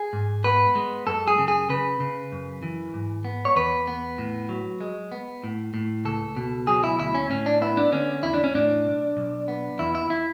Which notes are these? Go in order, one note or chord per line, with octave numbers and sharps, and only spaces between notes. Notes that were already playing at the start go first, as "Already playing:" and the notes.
Already playing: G#4
G#2
B3 B4
G#3
F#2 A4
G#4
C#3
G#4
C#3 B4
C#3
F#2
E3
G#2
B3
C#5
E2 B4
B3
A2
F#3
G#3
B3
A2
A2
C#2 A4
B2
F#3 G#4
E4
D2 E4
C#4
A2 C#4
D4
B3 E4
D4
D3 C#4
E2 E4
D4
C#4
A2 D4
B1
B1
B3
E2 E4
E4
E4